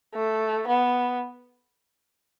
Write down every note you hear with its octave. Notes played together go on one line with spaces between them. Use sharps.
A3
B3